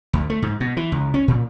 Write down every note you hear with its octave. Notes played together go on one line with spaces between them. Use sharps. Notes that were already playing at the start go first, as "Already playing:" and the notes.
D2
A3
G#2
B2
E3
C#2
C#4
A#2